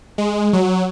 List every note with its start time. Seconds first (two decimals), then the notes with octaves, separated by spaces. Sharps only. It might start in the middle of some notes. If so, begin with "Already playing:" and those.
0.18 G#3
0.53 F#3